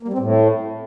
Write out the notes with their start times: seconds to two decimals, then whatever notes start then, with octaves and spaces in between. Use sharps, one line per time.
0.03 A#3
0.08 G3
0.13 C4
0.19 A2